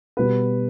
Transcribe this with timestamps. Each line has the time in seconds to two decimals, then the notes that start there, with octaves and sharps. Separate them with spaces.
0.17 B2 G3 B4